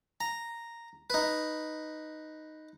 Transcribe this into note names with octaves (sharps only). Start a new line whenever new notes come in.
A#5
D#4 B4